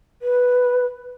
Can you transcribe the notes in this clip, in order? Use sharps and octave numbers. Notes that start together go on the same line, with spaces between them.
B4